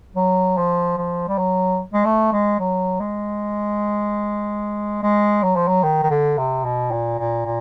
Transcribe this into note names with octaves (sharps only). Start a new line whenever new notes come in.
F#3
F3
F3
G3
F#3
G#3
A3
G#3
F#3
G#3
G#3
F#3
F3
F#3
D#3
D#3
D3
C3
B2
A#2
A#2
A#2